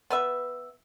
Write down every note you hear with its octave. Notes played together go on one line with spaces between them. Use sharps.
B3 B4 E5